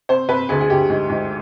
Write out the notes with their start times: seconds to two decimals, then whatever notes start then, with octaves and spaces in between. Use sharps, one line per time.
0.09 C3 C5
0.29 C3 B4
0.49 D2 G#4
0.61 G#4
0.70 D2 G4
0.90 G#2
1.09 G#2